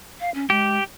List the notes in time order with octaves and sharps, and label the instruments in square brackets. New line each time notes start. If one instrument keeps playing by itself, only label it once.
[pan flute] F5
C#4
[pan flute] G#3 [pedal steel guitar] G4